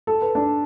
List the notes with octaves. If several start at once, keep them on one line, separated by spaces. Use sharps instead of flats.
A4
B4
D4